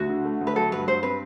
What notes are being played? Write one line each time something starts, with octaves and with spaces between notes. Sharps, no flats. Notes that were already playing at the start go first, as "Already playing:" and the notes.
Already playing: D2 F#4
D3
A3
D2
B4
F#3 A4
G2 B4
G2 C5
C4 B4